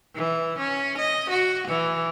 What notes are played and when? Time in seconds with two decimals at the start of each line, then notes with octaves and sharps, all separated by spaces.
0.15 E3
0.58 C#4
0.98 D#5
1.30 F#4
1.68 E3